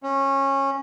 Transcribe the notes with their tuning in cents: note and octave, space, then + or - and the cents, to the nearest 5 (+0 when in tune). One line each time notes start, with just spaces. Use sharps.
C#4 -20